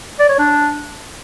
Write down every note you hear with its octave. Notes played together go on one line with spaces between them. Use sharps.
D5
C#5
D4